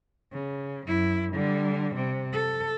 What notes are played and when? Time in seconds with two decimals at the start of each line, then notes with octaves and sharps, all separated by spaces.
0.33 C#3
0.87 F#2 E4
1.33 D3 G3
1.95 C3
2.33 A4